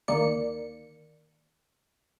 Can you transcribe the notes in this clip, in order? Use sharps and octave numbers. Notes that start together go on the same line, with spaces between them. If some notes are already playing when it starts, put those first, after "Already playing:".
D2 D#3 A#3 D5 C#7